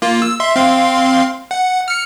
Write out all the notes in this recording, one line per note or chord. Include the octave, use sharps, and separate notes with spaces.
A#3 F4
E6
E5 C6
C4 F5 C6
F#5
F6 C#7